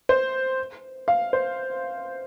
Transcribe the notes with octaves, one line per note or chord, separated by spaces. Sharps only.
C5
F5
C5